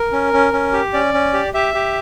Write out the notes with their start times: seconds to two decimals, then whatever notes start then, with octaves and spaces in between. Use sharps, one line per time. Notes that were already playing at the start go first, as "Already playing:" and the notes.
Already playing: A#4
0.13 C#4
0.33 C#4
0.53 C#4
0.73 G4
0.93 C#4 D5
1.14 C#4
1.34 G4
1.54 G4 E5
1.74 G4